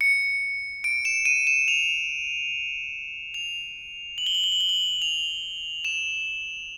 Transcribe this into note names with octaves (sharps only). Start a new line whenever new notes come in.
C#7
D7
E7
D#7
E7
F7
F7
F#7
G7
F#7
G7
F#7
G7
F#7
F7
E7